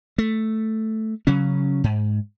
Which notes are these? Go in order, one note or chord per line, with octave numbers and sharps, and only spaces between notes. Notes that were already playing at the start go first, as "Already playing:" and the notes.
A3
C#3 F#3 C#4
G#2